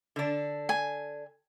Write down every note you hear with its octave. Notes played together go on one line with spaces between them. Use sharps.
D3 D4
G#5